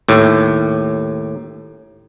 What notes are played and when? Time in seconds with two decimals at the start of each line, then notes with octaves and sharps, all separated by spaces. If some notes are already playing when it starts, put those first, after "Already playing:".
0.09 D#2 A2